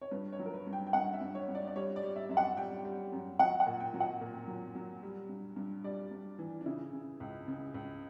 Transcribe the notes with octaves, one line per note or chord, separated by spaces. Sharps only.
C#5
G2 B4
C#5
F#3
A#4
B4
G2
G5
G5
G2 F#5
E5
G2
C#5
G2
D5
D5
G3 C#5
D5
G3
E5
F#2 E5
F#5
G3 G5
G3
F#2
F#3 F#5
F#5
A#2
G5
F#3
F#5
A#2
F#3
F#3
G3
G2
G2
G3 D5
G2
E3
D4
C#3 E4
C#3
C#2
C#3
C#2